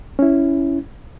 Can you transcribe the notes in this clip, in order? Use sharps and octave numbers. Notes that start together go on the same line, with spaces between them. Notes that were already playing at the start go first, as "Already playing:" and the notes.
C#4 E4